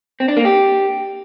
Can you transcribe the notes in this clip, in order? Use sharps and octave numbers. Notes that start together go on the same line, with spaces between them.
C4
D4
A#3
G4